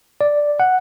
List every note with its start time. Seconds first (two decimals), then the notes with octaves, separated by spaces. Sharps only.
0.21 D5
0.60 F#5